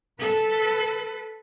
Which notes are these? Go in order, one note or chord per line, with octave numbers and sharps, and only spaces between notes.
A4 B4